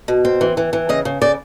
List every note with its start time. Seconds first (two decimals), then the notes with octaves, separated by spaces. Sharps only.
0.08 B2
0.25 C4
0.41 E3
0.57 E3
0.73 E3
0.89 C#3 D#5
1.05 C#3
1.21 C#3 D5